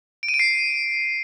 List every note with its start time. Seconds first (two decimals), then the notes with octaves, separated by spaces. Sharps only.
0.23 D7
0.28 D#7
0.34 D7
0.39 C7